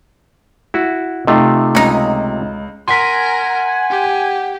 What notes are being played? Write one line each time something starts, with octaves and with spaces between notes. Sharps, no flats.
E4 F#4
C3 A3 D#4 F4
C#2 C#4 D#4
A#4 F#5 G#5 C6 B6
G4